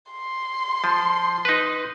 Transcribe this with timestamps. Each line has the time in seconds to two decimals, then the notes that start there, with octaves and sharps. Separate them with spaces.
0.12 C6
0.84 F3
1.45 D#4 B4